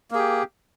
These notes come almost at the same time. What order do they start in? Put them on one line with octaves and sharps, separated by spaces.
A#3 G#4 G4